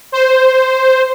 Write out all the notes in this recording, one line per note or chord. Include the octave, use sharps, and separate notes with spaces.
C5